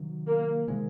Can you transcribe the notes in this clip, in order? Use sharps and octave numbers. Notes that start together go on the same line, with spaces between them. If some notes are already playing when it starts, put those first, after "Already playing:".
Already playing: C3 D#3 F#3
A#3
C3 D#3 G#3